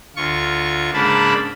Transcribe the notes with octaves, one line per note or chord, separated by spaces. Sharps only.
D2 F4 C#6
G#2 C#3 A#3 D4 A5 B5